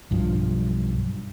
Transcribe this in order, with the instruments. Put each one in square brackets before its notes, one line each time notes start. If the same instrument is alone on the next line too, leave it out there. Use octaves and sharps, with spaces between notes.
[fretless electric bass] B1 G2 F3